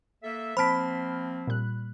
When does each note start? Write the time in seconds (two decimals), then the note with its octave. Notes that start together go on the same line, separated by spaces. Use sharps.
0.23 A#3 A4 E5
0.57 F3 A#3 C4 C5 A5 B5 F6 B6
1.47 A#2 G3 F#6